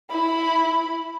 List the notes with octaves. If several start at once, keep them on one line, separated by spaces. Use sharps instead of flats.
E4 B5